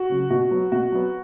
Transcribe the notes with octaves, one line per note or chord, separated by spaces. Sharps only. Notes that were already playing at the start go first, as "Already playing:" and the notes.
Already playing: F#4
C#3 F#3
B2 F#4
F#3 B3
B2 F#4
F#3 B3